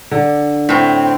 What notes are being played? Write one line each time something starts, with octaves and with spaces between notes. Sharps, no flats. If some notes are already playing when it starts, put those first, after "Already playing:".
D3
A2 C4